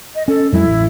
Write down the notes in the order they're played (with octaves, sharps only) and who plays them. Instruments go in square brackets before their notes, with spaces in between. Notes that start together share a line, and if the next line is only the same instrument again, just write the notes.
[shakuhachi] D#5
[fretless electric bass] C#4 [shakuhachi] A4
[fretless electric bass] F2 F#3 G#3 [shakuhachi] E4
[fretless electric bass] A1